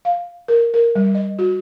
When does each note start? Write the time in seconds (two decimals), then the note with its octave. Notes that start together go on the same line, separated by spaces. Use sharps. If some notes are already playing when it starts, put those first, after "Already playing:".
0.05 F5
0.48 A#4
0.74 A#4
0.95 G3
1.15 D#5
1.39 F#4